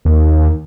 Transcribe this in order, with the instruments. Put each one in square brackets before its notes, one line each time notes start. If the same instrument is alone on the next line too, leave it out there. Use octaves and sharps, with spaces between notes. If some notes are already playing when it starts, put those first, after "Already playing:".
[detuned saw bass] D#2